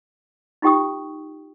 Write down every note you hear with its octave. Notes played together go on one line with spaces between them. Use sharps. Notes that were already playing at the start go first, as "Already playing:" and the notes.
D#4 F4 G4 G5 C#6 D#6